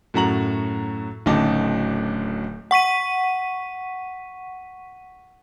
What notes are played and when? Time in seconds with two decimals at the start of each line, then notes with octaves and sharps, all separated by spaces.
0.14 F#2 A2 F#4 A#5 F#7
1.26 D1 D2 C#3 D#4 A5 D6
2.71 F#5 C#6 B6 D#7